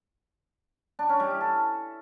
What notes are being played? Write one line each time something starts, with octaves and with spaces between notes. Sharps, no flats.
D4
C#4
G3
E4
A4